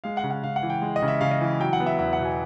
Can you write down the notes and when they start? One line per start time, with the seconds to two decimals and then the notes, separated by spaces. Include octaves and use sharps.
0.04 G#3 F5
0.17 F#5
0.24 C#3
0.31 F#5
0.43 C#3 F5
0.56 F#5
0.63 E3
0.70 G5
0.82 G#3
0.96 D#5
1.02 C#3
1.08 E5
1.21 C#3 F5
1.31 D#5
1.41 E3
1.60 F#3 G5
1.73 F#5
1.80 B3
1.86 E5
1.99 E2 E5
2.13 F#5
2.19 B2
2.25 G#5